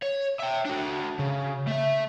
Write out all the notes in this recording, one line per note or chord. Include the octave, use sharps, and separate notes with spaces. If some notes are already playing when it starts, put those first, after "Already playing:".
C#5
E5 G5
D4 F#4
C#3
A3 E5